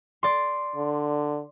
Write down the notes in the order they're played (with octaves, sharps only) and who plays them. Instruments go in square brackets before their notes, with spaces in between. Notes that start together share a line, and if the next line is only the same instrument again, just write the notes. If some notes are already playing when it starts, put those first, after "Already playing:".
[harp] D5 C6
[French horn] D3